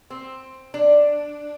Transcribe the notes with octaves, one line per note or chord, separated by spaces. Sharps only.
C4
D4